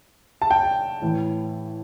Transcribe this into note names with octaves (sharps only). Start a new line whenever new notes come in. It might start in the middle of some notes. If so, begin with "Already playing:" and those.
A5
G5
A2 E3